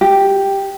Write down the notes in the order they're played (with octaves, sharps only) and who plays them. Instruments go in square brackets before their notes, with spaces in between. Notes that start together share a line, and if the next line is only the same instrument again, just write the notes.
[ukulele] G4